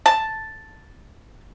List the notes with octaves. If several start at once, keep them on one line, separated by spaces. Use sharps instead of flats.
A5